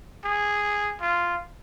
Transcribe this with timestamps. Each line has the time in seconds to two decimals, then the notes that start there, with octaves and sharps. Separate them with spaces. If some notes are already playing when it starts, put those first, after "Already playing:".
0.24 G#4
1.01 F4